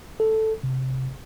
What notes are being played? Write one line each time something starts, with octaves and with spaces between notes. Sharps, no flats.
A4
C3